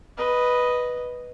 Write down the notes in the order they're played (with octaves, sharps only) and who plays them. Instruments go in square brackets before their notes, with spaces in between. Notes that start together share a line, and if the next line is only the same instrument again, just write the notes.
[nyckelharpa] B4 D#5